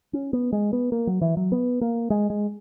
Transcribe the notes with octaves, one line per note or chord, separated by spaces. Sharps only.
C#4
B3
G#3
B3
A#3
F#3
E3
F#3
B3
A#3
G#3
G#3